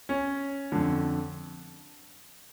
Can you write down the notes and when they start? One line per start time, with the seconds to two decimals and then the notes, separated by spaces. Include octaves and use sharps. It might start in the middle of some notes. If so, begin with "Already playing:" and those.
0.09 C#4
0.72 F2 D3